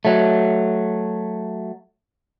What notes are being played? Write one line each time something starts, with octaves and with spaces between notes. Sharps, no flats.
F#3 A3